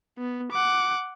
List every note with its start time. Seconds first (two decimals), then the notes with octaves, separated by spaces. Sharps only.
0.18 B3
0.52 F#5 D6